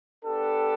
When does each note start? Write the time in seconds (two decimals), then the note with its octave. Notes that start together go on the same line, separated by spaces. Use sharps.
0.23 B3 D4 G4 A4